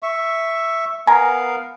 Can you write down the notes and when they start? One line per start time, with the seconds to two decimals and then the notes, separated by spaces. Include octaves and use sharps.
0.03 E5 C#6
1.07 B3 A#4 F5 G#5 A#5